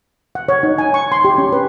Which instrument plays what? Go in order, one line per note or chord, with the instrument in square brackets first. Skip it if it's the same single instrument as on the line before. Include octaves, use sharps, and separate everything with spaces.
[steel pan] F#5
C#5
D#4
G#5
C#6
C6
G4
C#4
B4